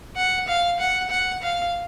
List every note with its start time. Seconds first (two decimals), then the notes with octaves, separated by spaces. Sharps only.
0.16 F#5
0.47 F5
0.79 F#5
1.10 F#5
1.42 F5